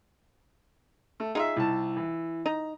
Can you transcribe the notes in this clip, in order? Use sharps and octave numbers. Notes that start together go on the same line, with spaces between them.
A3
D#4 F4 G#4 E5
C2 E4 A5
E3
D#4 A#5